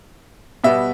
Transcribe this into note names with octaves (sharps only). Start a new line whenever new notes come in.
B2 G3 B3 E5